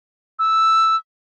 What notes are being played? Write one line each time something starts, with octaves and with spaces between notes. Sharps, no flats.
E6